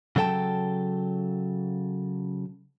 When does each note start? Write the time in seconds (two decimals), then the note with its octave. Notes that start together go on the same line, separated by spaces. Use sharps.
0.16 C#3 F#3 A4 G5 A5